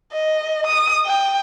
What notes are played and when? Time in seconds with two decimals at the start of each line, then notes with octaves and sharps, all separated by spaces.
0.13 D#5
0.67 D#6
1.06 G5